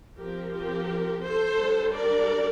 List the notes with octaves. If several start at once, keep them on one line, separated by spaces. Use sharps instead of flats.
F3 C4 G4 A#4
G4 A#4
A4 C5
G3 D4
A#4 D5